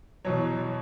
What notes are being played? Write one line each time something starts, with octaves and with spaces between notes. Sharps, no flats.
E2 B2 F#3 C#5